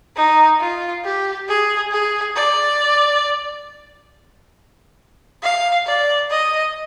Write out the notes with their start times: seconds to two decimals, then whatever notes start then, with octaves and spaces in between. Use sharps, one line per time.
0.16 D#4
0.60 F4
1.04 G4
1.48 G#4
1.91 G#4
2.36 D5
5.43 F5
5.87 D5
6.30 D#5